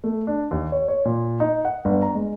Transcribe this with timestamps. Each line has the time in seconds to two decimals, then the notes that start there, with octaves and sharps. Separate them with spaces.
0.04 A3
0.27 D4
0.51 D#2
0.72 C#5
0.88 C#5
1.05 A#2
1.40 D#4
1.65 F#5
1.85 G1
2.02 A#5
2.15 G#3